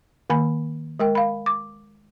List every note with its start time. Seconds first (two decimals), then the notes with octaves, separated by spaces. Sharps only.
0.30 D#3 A#3 G#5 B5
0.99 G#3 A#4 G5
1.15 F5 B5
1.46 D6